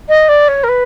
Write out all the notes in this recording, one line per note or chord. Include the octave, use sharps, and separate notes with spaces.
D#5
D5
C#5
A#4
B4